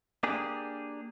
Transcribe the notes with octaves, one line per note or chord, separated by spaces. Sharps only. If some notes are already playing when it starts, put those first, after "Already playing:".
A#3 D4 G4 G#4